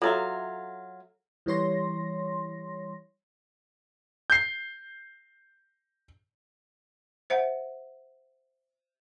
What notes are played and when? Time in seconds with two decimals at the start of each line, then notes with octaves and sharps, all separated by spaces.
0.02 F#3 F4 A4 E5 A#5
1.46 E3 G3 C#5 C6 A#6
4.30 G6 C7
7.30 C5 E5 F#5